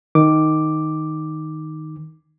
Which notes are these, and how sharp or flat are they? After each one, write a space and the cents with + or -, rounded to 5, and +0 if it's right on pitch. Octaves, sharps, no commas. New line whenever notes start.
D#3 +0 D6 +0